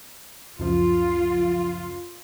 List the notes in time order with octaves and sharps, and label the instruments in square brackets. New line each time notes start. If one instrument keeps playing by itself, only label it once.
[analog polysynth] C#2 F#2 F3 [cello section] F4